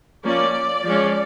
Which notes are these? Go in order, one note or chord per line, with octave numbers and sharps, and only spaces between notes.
F3 A#3 C#4 D5
F3 G#3 C#4